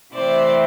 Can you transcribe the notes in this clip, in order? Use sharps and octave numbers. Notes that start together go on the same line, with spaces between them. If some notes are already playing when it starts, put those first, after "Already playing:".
C3 E3 A3 C4 C5 D5